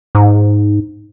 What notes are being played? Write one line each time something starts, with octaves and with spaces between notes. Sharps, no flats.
G#2